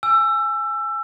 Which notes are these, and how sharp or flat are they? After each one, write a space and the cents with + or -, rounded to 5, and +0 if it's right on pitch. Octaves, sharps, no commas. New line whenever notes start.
G#5 +0 E6 +20